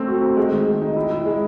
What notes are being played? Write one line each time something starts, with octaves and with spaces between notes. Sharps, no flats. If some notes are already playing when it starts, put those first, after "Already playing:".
Already playing: A3 C4
F#4
C4
G#3
D#3
G#3
D#4
E4
E4
G#3